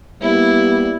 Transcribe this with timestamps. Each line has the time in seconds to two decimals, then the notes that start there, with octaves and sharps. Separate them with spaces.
0.22 G3 A#3 B3 E4